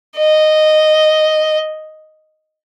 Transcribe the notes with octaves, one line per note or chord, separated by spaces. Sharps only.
D#5